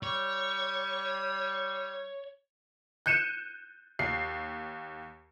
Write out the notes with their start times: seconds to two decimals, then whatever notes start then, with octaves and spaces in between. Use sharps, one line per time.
0.03 G3 C#5
3.06 F#6 G6 C#7 D#7 E7
3.99 D#2 C7